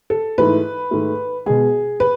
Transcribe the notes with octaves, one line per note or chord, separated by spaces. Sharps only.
A4
G#2 E3 A3 B4
G#2 D#3 A3
B2 G#3 G#4
B4